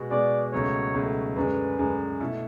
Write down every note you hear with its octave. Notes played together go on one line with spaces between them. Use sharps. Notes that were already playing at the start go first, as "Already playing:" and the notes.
Already playing: B2 G#3 B3 F#4
B2 G#3 B3 F#4 D5
C#2 B2 F#3 A3 C#5
C#2 B2 F#3 A3
F#2 D3 G#3 B4
F#2 D3 G#3
B2 A3 E4 A4